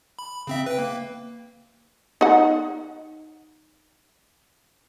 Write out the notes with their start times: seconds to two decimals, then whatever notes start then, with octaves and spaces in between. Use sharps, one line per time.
0.19 B5
0.47 C#3 C4 E5
0.66 B4 G5
0.79 A#3
2.21 D#4 F#5